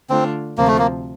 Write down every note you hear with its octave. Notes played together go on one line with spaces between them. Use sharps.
D3 A3 C4 D4 F4
D2 C3 F3 A#3 C4 F4
A3
A#3